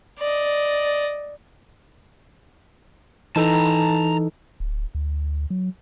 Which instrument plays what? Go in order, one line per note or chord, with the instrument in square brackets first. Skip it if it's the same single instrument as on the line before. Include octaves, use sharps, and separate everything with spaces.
[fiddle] D5 D#5
[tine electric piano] E3 D#4 A4 [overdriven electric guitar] A5 A#5
[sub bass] D1
D2
F#3